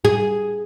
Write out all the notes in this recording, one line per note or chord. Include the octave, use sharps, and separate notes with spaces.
G#4